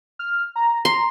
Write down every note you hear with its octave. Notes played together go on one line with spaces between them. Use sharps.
F6
A#5
A#5 C6